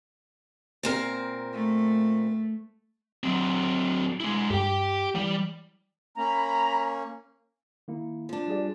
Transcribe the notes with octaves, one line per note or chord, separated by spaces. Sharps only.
A#2 C4 A#4
A3
F#3 C4
G#3 E4
G2 G4 G5
E3 G3
A#3 C#4 A#5 B5
D#3 A#3 E4
F3 D4
G3 G#4 D5